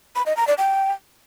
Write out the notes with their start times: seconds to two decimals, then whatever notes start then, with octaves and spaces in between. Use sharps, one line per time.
0.16 B5
0.26 D#5
0.37 A#5
0.47 D5
0.58 G5